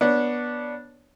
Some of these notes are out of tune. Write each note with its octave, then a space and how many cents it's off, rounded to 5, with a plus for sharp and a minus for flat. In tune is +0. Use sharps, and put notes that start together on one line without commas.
B3 -15 D4 +0 C#5 +0